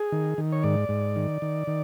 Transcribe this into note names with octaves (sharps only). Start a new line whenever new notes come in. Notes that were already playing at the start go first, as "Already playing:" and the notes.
Already playing: G#4
D#3
D#3
C#5
G#2 D5
G#2
D#3
D#3
D#3